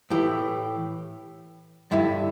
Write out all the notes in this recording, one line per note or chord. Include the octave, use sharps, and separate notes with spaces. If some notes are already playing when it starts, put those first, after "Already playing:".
A2 E3 G4
G2 D3 E4